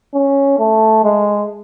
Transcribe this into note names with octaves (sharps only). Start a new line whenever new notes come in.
C#4
A3
G#3